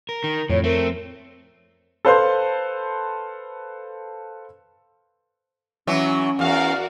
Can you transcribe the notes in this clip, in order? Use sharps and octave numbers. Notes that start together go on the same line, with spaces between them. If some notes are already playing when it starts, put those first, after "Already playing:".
A#4
D#3
F2 A2 C#5
A3 C4 A#4
A4 B4 C5 F5 C6 G6
E3 F#3 C#4
E2 F#4 A#4 D5 F5